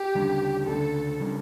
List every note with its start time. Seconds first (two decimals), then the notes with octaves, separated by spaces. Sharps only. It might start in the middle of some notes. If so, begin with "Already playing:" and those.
Already playing: G4
0.15 D2 C#3 G3 D4
0.67 D2 C#3 G3 D4 A4
1.20 C#3 G3 D4